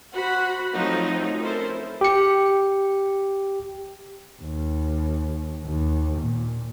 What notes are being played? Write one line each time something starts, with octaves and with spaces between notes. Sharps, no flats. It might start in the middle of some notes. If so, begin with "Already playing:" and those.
F#4 C5 F#5 B5
F3 F#3 A3 C4 D#4
C#4 E4 A4 A#4 C5
G4 C#7
D#2
D#2
A#2